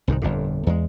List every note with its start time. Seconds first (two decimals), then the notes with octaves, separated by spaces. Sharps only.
0.08 C2 G#2 D3 D#3
0.22 G1 F2 A#2 D3
0.67 E2 G#3